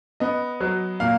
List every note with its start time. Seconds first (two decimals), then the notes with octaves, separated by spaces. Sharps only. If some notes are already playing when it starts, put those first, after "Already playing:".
0.20 B3 D#5
0.60 F#3
1.00 A#2 F5